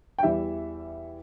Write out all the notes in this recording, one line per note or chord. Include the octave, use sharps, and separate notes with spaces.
G5
E2 E3 G3 E5